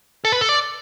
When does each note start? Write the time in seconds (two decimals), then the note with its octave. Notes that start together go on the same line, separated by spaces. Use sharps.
0.25 A4
0.32 B4
0.41 A4
0.49 D5